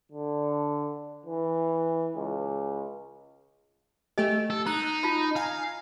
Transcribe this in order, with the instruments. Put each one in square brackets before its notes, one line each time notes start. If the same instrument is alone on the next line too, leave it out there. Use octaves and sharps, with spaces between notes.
[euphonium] D3
E3
C#2
[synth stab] A3 G4 [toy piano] D#5 G#5
[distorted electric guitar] A4
[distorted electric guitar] D#4 [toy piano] A#5 [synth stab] F#6
[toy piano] F4 A5 B5
[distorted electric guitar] F5 [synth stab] G#5 A#5